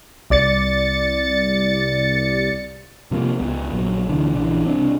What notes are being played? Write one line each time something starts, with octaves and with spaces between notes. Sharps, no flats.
C2 D5 A6 C#7
C3 F3 A3 A#3
C#2 B3
A#1 F#3
D2 B2 D3 E3
A#1 C#3 E3 D4
C2 C4 D4